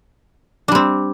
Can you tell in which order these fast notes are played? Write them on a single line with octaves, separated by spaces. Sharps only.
D4 G3 C4